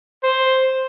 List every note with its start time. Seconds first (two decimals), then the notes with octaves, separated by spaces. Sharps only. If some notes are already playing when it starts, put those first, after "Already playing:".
0.23 C5